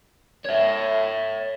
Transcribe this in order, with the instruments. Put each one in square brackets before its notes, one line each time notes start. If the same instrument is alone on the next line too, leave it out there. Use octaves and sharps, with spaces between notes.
[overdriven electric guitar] C#5 E5